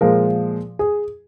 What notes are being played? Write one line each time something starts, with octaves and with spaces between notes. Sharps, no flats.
A#2 F3 G#3 A#4
G#4